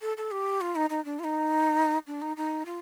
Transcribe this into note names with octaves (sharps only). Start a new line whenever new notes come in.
A4
A4
G4
F4
D#4
D#4
D4
F4
D#4
D4
D#4
D#4
F4